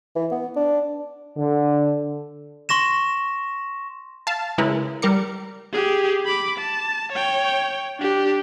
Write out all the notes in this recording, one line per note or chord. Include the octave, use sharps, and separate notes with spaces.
E3
B3
D4
D3
C6 C#6 A#6 E7
F5 A5
C#3 G#3 E4 A#4 B4
G3 A#4 D6 C#7
G4 G#4
B5 D6
A5
C#5 G5
D4 G4